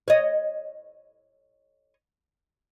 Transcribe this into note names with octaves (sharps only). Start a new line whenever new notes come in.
C#5 D#5